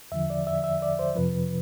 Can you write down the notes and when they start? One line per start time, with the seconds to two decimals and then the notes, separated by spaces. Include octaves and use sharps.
0.12 E2 D3 F3 E5
0.30 D5
0.47 E5
0.64 E5
0.82 D5
0.99 C5
1.16 F2 C3 F3 B4